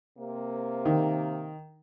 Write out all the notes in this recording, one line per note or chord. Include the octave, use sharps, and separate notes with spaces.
C3 A#3
D#3